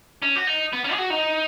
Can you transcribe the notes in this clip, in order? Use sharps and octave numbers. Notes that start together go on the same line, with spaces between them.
C#4
F#4
D#4
B3
C#4
G#4
F#4
D#4